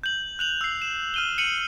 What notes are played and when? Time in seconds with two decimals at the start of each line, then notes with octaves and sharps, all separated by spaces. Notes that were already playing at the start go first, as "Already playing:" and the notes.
0.03 G6 F#7
0.39 F#6 F7 F#7
0.61 E6 C7
0.82 E7
1.14 F6 D#7 G7
1.38 C#7 D#7 F#7